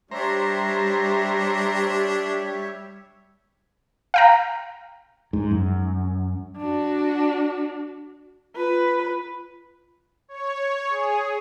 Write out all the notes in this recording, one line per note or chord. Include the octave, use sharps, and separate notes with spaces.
G3 D4 G4 C5 C#5 E5 A#5
F5 G5 A#5
G#2
F#2
D4 F#4
F4 B4
C#5
G#4